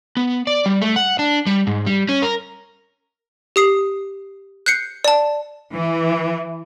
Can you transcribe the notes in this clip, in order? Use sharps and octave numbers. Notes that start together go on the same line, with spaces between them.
B3
D5
G3
A3
F#5
D4
G3
G#2
G3
C#4
A#4
G4 D#6 C7
F#6 G6 C7 C#7
D5 A5
E3